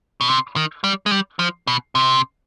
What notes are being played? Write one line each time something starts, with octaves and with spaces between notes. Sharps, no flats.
B2
C3
D#3
G3
G#3
G3
F3
B2
C3